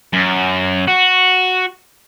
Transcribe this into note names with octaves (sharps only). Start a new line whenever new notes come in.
F#2
F#4